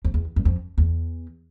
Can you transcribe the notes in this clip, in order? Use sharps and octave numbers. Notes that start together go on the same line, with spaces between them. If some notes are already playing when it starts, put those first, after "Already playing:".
F2
E2
F#2
F2
E2